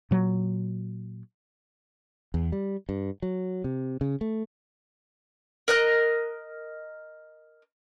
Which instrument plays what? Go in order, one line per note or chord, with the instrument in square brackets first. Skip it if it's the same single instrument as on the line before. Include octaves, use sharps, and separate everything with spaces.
[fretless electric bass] A#2 F#3
[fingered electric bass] E2
G3
G2
F#3
C3
C#3
A3
[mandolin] A#4 D#5 F#6